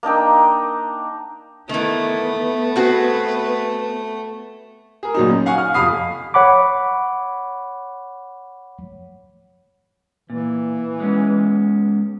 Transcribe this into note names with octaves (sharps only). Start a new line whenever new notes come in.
A#3 D4 D#4 G5
D#3 E3 A3 B3
C4 F#4 G#4 B4
G#4 A#4
A#1 F#3 D#4
C#4
F5 F#5 G#5 C#6
F6
F2 C3 F5 B5 D#6 C7
C#5 F#5 B5 D6
A#2 E3
G#3 B3 C#4